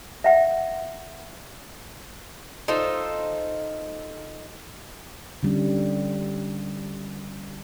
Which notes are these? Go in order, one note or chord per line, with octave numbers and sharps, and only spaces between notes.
E5 F#5
D#4 F4 A4 C5
D3 G3 C#4